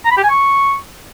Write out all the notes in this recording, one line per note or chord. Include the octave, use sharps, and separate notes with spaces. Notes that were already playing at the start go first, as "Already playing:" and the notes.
A#5
B5
G4
G#5
C#6